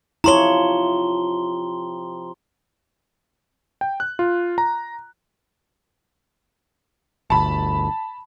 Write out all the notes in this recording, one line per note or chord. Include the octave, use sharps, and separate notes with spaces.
C3 F3 E4 C#5 A#5 C6 G7
G5
F#6
F4
A#5
G1 D2 A5 B5